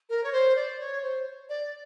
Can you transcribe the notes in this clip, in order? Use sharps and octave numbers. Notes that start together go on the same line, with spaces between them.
A#4
C#5
C5
D5
C#5
C5
D5